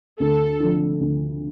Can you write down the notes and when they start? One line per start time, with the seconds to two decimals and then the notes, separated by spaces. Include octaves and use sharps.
0.19 D2 A4
0.60 D3 F3
1.01 D2